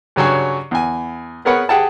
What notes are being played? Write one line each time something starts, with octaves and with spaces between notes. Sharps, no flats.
G2 C#3 F#3 C#5 G#5
E2 G#5
B3 G#4 A#4 B4 C#5 F#5
G4 G#4 F#5 G5 A5